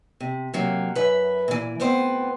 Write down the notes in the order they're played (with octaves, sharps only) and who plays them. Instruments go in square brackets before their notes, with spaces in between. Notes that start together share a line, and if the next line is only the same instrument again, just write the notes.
[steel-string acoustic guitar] C3
C3 F#3 A#3
F#2 B4 E5
A#2 E3
D2 B3 C4 C5